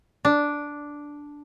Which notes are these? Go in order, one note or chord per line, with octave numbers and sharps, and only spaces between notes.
D4